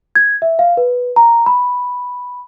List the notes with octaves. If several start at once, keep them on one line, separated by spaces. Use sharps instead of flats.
G#6
E5
F5
B4
A#5
B5